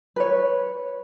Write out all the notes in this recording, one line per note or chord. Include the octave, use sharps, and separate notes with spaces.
B4 C#5